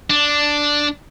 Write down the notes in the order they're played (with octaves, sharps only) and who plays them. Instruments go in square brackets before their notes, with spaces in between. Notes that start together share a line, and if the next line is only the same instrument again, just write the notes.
[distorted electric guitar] D4